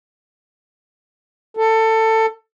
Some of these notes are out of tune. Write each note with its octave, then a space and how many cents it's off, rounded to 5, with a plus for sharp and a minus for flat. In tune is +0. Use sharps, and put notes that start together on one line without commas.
A4 +20